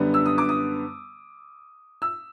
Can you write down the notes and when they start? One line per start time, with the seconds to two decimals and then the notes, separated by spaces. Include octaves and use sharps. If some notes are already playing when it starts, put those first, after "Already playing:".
Already playing: F#2 D3 G3 B3 D4
0.14 E6
0.26 D#6
0.38 D6
0.49 D#6
2.02 E6